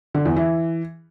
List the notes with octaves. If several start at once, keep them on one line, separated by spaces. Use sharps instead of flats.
D3
E2
E3